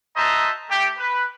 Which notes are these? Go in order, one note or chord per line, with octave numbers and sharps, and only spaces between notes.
F#4 C5 D#5 E5 A5 A#5
A3 G4
B4